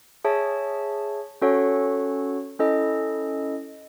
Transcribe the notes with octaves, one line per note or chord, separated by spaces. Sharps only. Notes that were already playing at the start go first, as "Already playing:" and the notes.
G#4 C#5 E5 A5
C#4 F#4 A4 C#5 F#5
C#4 E4 A4 D#5